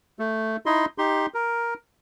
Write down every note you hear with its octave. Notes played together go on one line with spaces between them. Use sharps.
A3
D#4 E4 D#5 C6
D#4 G4 C6
A#4